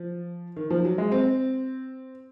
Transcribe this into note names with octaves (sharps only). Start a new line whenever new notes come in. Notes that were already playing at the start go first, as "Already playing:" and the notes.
Already playing: F3
D#3
F3
F#3
G#3
C4